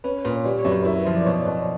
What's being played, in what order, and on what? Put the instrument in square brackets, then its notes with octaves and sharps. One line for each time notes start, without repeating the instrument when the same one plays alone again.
[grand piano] C#4 [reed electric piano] B4
[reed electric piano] B4
[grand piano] A#2
[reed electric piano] C#5
[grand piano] G3 [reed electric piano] D5
[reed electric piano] C#5
[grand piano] F#2
[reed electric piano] B4
[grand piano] E4 [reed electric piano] A#4
[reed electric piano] B4
[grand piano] F3 [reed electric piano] C5
[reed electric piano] D5
[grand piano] B2 [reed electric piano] C#5
[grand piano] B2